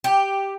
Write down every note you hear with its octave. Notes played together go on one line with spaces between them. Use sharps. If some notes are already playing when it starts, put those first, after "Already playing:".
G4